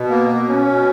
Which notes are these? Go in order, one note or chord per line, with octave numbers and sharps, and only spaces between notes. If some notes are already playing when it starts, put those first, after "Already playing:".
Already playing: B2
A#3
B2
C#4
B2